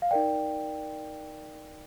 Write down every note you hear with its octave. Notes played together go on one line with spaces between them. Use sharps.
F5
D#4 A#4 D5 G5